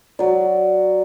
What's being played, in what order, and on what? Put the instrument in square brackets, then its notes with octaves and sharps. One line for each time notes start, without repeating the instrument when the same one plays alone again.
[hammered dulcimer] F#3 D5